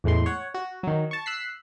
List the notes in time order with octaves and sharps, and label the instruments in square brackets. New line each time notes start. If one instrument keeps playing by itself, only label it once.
[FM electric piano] E2 A2 G#3 C6
C#5 F#5
F#4
D#3 F#3
A5 C#6
E6 F#6 B6 C7